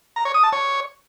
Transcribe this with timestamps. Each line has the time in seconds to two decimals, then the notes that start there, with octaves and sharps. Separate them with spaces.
0.16 A#5
0.25 C#5
0.34 D#6
0.43 A5
0.53 C#5